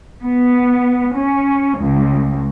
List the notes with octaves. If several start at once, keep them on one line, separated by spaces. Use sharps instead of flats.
B3
C#4
C#2